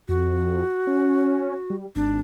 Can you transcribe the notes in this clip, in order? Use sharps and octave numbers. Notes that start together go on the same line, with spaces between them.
F2 F#4
C#4
G3
G#1 D4